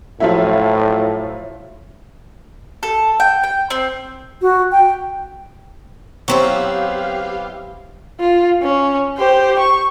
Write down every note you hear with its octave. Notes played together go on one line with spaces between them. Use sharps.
A2 F3 F#3 E4
A4
G5
G5
C4
F#4
G5
F#3 B3 C4 E4 G4 F5
F4
C#4
G4 C5
C#6